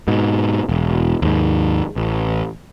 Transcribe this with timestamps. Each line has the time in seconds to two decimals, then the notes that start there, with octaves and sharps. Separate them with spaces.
0.08 G#2 B2
0.69 E1
1.22 D#2 G#2
1.96 A1